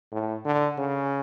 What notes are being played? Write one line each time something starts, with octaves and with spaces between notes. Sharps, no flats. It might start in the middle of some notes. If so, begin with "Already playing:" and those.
A2
D3
C#3